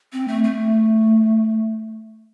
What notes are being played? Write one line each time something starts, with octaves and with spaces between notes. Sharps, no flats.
C4
A3
A3